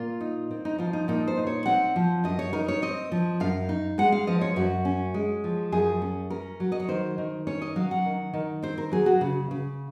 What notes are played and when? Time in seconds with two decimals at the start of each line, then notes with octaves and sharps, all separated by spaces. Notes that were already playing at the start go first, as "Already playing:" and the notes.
Already playing: A#2 F4
0.21 D#4
0.51 C4
0.65 D#4
0.78 F3 F4
0.93 D#4
1.08 A#2 D#4
1.28 C5
1.37 D#4
1.47 C#5
1.66 C4 F#5
1.96 F3
2.24 F#2 D#5
2.39 C#5
2.53 D#4 A#4
2.68 C#5
2.82 C4 D#5
3.12 F3
3.40 F#2 F5
3.69 D#4
3.98 G#3 F#5
4.12 F5
4.27 F3 D#5
4.41 C#5
4.56 F#2 F#4
4.85 C#4
5.14 G#3
5.44 F3
5.72 F#2 G#4
6.02 C#4
6.30 C#4 A#4
6.60 F#3
6.72 D#5
6.80 C#5
6.88 D#3 C5
7.18 D#3
7.47 C#4 C#5
7.62 D#5
7.76 F#3 F5
7.91 F#5
8.05 D#3
8.34 D#3
8.62 C4 C5
8.78 A#4
8.92 F#3 G#4
9.06 F#4
9.21 C#3
9.51 C#3